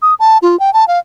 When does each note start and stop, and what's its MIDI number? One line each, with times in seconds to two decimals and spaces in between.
0.02 0.14 87
0.19 0.38 81
0.42 0.59 65
0.60 0.73 79
0.74 0.87 81
0.88 0.99 77